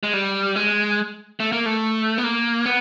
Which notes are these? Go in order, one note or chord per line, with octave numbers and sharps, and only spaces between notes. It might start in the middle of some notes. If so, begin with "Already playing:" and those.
G#3
G3
G#3
A3
A#3
A3
B3
A#3
B3